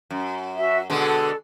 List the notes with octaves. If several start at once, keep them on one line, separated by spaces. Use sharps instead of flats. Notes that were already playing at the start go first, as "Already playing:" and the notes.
F#2
F#4 E5
B2 D3 G#3 A4